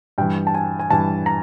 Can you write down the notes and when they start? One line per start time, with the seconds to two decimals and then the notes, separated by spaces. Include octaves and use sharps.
0.18 G2 E3 G5
0.47 A5
0.54 G#5
0.79 G#5
0.90 G2 E3 A5
1.26 A#5